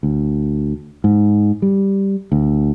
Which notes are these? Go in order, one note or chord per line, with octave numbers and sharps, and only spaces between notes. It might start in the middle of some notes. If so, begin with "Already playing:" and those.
D2
G#2
G3
D2